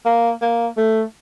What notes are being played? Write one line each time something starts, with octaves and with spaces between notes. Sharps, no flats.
A#3
A#3
A3